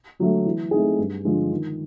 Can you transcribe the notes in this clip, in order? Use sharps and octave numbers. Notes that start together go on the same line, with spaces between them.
D3 F#3 A3
E3
A3 C4 D#4 G#4
G2
D3 F3 G#3
D#3